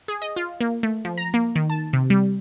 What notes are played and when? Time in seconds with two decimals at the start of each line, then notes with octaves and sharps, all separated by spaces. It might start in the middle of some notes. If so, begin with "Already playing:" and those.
0.08 G#4
0.22 D#5
0.36 F4
0.60 A#3
0.83 A3
1.05 F3
1.17 A#5
1.34 A#3
1.55 D#3
1.70 A5
1.93 C3
2.10 G3